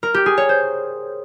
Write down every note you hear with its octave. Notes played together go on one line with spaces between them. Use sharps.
A#4
G4
G#4
C#5
C5